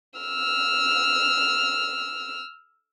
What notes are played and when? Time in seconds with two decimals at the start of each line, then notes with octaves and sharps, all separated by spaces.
0.20 E6 F6